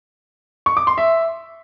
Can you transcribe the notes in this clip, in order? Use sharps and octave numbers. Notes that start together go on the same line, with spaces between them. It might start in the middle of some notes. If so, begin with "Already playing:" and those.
C#6
D6
C6
E5